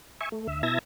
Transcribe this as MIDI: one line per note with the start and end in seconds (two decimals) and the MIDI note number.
0.21 0.29 76
0.21 0.29 80
0.21 0.29 85
0.32 0.47 57
0.47 0.63 38
0.47 0.63 76
0.63 0.79 47
0.63 0.79 64
0.63 0.79 76
0.63 0.79 81
0.63 0.79 92
0.63 0.79 94